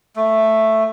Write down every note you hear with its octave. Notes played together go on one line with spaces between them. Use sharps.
A3